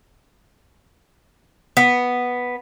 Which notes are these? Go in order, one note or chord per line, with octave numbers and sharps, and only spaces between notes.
B3